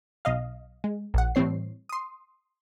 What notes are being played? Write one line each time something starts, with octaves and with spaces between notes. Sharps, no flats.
B1 D#5 F5
G#3
A#1 F#5
A2 E3 G3 C4 C#5 C7
C6 D#6